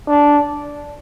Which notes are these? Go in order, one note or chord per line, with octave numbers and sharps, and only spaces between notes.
D4